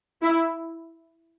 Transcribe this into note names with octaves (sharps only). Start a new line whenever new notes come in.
E4